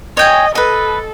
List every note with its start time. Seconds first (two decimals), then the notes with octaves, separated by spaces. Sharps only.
0.17 C#5 D#5 G5 G#5
0.55 A4 B4 D#5